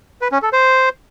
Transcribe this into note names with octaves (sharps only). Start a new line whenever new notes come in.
B4
C#4
A4
C5